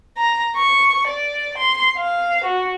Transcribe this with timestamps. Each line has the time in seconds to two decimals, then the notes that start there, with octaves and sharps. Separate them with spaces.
0.17 A#5
0.56 C#6
1.07 D5
1.57 C6
1.96 F5
2.44 F#4